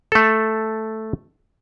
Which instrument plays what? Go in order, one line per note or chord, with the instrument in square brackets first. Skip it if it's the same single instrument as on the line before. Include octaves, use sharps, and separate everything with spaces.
[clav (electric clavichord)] A3 A4